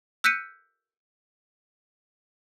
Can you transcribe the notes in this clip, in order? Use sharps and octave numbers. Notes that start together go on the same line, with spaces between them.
E6 F#6 G6 B6 C#7 D#7